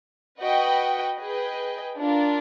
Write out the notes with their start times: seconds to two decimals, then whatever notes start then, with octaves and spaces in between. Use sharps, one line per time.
0.40 F#4 B4 D#5 G5
1.19 G#4 B4 D#5 G5
1.97 D4 F4 A#4